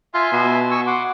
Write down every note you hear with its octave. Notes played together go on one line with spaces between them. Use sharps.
F4 E5 G#5 C6
B2
G#5 C#6 E6
F#5 C6 D6